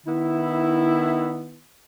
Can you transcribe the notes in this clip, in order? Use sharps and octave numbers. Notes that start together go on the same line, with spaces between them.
D#3 B3 E4